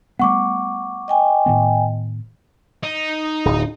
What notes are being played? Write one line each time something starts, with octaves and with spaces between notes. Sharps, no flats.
G3 A3 B3 F#5 C#6 D6
D#5 G5 G#5
A2 D#3 B3
D#4
D1